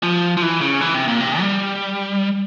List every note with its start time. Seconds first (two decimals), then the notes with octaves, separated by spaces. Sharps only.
0.03 F3
0.37 F3
0.42 E3
0.61 C#3
0.81 E3
0.94 C3
1.08 A#2
1.20 C3
1.40 G3